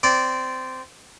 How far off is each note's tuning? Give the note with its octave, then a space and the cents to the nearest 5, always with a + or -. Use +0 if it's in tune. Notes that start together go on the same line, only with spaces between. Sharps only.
C4 -15 D5 -15